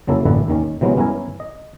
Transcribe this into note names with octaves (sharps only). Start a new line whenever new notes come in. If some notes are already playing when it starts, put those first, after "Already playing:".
F2 C#3 F#3 A#3 E4 A4
A1 F#2 A#2 D3 E4 B4
D#2 D#3 C#4
C3 E3 F#3 G#3 B3 C#4
G2 B3 C#4 E4 A#4 G#5
D#5